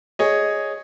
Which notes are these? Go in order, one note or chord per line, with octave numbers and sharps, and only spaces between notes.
G#4 C#5 D#5